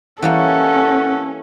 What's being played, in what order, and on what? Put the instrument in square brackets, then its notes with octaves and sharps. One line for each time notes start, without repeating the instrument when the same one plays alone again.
[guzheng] E3 G3 A#3 [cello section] C#4 [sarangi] A4 [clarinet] F#5